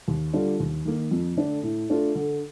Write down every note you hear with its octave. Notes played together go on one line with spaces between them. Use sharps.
D#2
D3 G3 D4 F4
D#2
D#3 A#3 D#4
F2
D3 A3 D4
A2
A3 D4 F4
D3